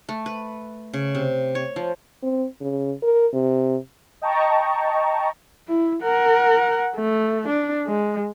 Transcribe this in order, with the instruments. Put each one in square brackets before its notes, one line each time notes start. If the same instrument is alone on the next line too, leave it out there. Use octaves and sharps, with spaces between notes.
[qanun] A3
B4
C#3
C3
C#5
F3
[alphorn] C4
C#3
A#4
C3
[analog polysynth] D#5 G5 A5 A#5 C#6
[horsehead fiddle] E4
A#4 F#5
A3
D4
G#3